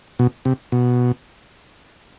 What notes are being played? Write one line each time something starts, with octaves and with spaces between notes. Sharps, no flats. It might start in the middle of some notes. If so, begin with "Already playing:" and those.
B2
C3
B2